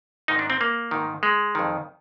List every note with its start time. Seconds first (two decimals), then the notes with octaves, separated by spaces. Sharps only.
0.28 G#2 D#3 D#4
0.39 D4
0.50 C4
0.61 A#3
0.91 G#2 D#3
1.23 G#3
1.55 F2 D#3